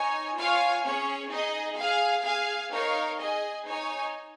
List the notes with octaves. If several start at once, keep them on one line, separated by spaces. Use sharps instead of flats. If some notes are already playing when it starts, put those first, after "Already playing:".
Already playing: D#4 C#5 G#5
F4 C#5 F5 G#5
C#4 G#4 C#5
D#4 G#4 D#5
G#4 F5 G#5
G#4 F5 G#5
D#4 A#4 C#5 F5
G#4 D#5 G#5
D#4 C#5 G#5